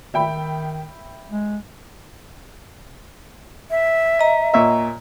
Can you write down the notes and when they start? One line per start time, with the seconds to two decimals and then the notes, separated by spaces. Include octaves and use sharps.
0.14 D#3 E5 G5 B5
1.30 G#3
3.71 E5
4.19 D#5 A#5
4.54 A#2 C#5 E5